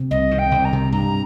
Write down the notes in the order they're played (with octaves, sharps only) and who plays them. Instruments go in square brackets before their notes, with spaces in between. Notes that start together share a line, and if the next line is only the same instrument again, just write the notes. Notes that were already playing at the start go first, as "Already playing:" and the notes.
Already playing: [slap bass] C3
[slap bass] C2 [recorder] D#5
[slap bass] D#3
[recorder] G5
[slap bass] C2
[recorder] A#5
[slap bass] C3
[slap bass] G2 [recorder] A#5